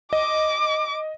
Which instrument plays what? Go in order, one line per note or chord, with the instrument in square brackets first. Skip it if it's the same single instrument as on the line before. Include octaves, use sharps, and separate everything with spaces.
[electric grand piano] D#5 [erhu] D6